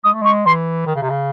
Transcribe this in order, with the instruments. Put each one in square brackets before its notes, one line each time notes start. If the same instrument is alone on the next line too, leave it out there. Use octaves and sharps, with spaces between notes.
[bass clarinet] G#3 [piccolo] D#6
[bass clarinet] A3
[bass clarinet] G#3 [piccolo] C#6
[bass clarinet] E3 [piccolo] C6
[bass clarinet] D#3
C#3
C3
C#3